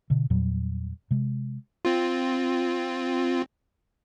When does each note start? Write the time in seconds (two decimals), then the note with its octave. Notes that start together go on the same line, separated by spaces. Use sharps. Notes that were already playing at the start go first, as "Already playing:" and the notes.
0.10 B2 D3
0.30 E2 A#2 F#3 G3
1.11 C3 G#3
1.85 C4 F4